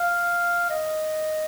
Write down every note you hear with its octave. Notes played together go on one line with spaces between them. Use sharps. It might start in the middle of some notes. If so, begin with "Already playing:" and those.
Already playing: F5
D#5